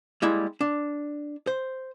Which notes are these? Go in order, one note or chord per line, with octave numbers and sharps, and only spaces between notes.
G3 G#3 A#3 E4
D4
C5